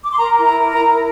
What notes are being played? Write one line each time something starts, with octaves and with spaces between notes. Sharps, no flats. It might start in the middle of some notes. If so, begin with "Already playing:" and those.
D6
C6
A#4 A#5
E4
A#5
A#4
A#5
E4